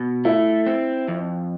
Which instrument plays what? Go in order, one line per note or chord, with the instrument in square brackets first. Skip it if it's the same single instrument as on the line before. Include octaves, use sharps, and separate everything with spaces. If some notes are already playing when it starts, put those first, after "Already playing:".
Already playing: [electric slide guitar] B2
[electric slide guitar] A3 [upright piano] E4
[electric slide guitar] C4
F2